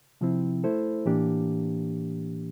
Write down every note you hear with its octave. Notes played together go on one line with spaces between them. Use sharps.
C3 F3 C4 E4
A3 E4 A4 C5
A2 E3 A#3 D4 G4